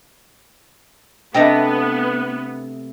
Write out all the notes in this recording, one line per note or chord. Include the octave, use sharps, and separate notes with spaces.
C3 A3 B3 D4 D#5 G5